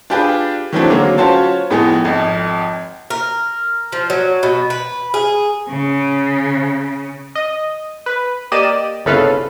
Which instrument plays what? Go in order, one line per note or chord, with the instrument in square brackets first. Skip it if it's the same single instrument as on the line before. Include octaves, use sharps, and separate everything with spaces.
[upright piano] D4 F4 G4 G#4 B4
D#3 E3 F#3 A3 C4 D4
D3 F#3 G#3 A#3
C#4 F4 F#4 C5 C#5 A5
F2 A2 G#3 B3 D#4 G#5
G#1 F2
[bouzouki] A#4
F3
F#3
B2
B4
G#4
[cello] C#3
[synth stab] D#5
B4
A#3 G4 D5 D#5 D#7 E7
G1 C2 C#3 A4 B4 F5